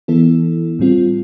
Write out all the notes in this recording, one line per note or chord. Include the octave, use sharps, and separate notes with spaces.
E3 B3 E4 A4
A2 G3 C4 F4